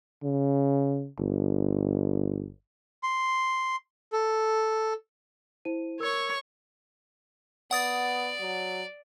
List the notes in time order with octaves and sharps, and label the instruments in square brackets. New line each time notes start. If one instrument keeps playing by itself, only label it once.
[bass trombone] C#3
G1
[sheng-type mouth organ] C6
A4
[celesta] E4 C5 D#7
[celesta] A#4 E6 [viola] C#5 C#6
[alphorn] B3 [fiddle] D5 [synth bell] F#5 D#6 A6
[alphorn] F#3